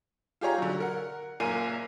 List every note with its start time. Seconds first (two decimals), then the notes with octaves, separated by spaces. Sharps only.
0.41 F4 G4 G#4 C#5 A#5
0.58 D3 F#3
0.80 A#4 F#5
1.40 F#1 A#2 A#4 G#5 C7 D#7